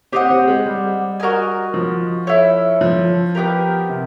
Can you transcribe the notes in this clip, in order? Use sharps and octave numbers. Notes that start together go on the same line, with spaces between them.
C4 G4 C5 D#5 F#5
C4
G#3
G3
F#4 A#4 D#5 G#5
F3
E4 A4 C#5
F3
B3 D4 G4 A#4
C3